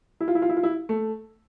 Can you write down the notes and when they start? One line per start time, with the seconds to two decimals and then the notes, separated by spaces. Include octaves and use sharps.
0.20 E4
0.28 F4
0.35 E4
0.42 F4
0.49 E4
0.57 F4
0.63 E4
0.89 A3